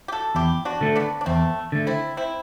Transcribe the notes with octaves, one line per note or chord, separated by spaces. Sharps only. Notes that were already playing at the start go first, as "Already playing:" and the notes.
G4
F#4 A4
E2 E4 G4
D4 F#4
D3 A3
B3 D4
D4
E2 A3 C4
D3 A3
C4 E4
C4 E4